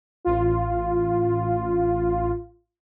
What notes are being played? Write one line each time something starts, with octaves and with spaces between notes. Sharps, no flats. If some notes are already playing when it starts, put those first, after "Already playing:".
A1 F4